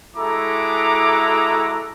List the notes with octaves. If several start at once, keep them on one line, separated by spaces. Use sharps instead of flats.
G#3 E4 F#4 A4 A#5 D6